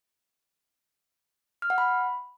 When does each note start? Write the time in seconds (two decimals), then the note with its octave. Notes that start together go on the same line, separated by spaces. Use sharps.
1.62 F6
1.70 F#5
1.78 B5